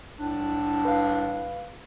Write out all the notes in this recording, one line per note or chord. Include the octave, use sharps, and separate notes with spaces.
C2 A2 D4
B4 F5